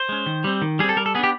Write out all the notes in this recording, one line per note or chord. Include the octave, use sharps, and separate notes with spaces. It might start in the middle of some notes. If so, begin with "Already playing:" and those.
Already playing: C5
G#3 C#4
D#3
G3 C4
D#3
G3 C4 G#4
A4
G3 A#4
A4
B3 D4 G4 G#4